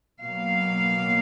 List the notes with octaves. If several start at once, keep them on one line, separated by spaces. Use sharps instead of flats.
B2 F#3 A#3 F5